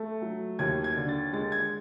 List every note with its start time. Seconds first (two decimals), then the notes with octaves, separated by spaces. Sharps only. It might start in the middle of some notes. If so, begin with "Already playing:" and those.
Already playing: A3
0.22 F#3
0.59 D#2 G#6
0.84 G#6
0.97 D3
1.09 A6
1.33 G#3 A6
1.52 G#6